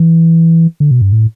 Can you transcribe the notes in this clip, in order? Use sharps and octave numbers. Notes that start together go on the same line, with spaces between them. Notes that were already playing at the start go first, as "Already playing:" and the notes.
Already playing: E3
D3
B2
G2
A2